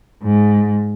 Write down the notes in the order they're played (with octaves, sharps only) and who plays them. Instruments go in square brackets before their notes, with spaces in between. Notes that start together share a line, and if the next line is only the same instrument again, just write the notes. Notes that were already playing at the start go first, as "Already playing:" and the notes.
[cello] G#2